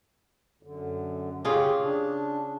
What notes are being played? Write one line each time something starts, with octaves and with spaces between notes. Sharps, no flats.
F#2 D3
C#3 F4 G4 G#4
D4